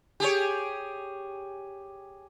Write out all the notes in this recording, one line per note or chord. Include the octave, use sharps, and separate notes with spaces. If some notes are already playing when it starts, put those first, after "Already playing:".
G4 G#4 C#5